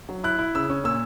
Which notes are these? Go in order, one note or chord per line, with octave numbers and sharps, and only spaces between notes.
F#3
E4 F#6
E4
C#3 E6
C#4
A#2 E6